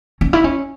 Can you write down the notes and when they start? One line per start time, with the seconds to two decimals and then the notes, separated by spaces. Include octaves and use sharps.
0.21 C#4
0.33 E4
0.44 C#4